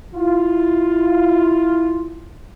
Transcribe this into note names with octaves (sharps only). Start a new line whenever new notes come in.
E4 F4